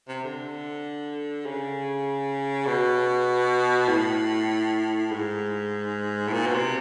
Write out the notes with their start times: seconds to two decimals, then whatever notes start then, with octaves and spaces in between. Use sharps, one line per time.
0.09 C3
0.24 D3
1.46 C#3
2.67 B2
3.89 A2
5.11 G#2
6.28 A2
6.33 A#2
6.47 B2
6.54 C3